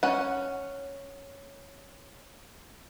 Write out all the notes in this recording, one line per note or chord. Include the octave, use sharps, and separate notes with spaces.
C#4 F#5